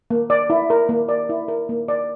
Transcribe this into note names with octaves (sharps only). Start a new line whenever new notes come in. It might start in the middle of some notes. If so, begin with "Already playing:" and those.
A#3
D5
E4
A#4
A#3
D5
E4
A#4
A#3
D5